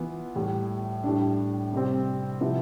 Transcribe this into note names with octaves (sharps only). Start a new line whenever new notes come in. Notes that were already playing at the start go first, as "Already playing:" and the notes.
Already playing: E3 B3 F4
A2 E3 G3
A2 G3 D4
C3 G3 C4
C3 F3 B3 E4